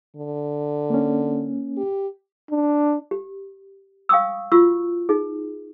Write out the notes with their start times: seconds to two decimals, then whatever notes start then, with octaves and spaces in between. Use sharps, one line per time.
0.16 D3
0.90 A#3 C#4
1.77 G4
2.51 D4
3.11 G4
4.09 F5 G5 C#6 D#6 E6
4.52 F4 F#4 C#6 E6
5.09 D#4 G#4